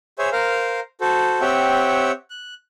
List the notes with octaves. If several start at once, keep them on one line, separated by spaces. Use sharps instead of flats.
G#4 C5 C#5 E5 G#5
A#4 C5 F5 A#5
F#4 A4 C5
C4 G4 C#5 E5 F#5 G5
F#6